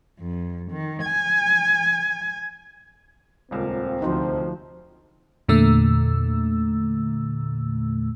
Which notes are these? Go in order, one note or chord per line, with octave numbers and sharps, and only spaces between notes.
F2
D#3
G#5
D#1 C#2 C4 A#4
D2 C3 F3 D#4 F#4 C5
E2 A#2 D3 A3 E6